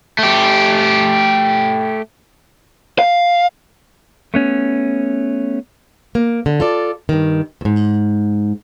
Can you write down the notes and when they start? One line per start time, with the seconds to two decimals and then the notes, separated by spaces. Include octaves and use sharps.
0.19 A3 G4
2.99 F5
4.34 A3 B3 C#4
6.15 A#3
6.46 D3
6.60 F4 A4 D5
7.09 G2 D#3
7.61 E2 G#2